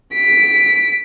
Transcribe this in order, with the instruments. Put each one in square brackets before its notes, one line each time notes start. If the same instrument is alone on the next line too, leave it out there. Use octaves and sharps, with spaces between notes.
[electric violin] B6 D7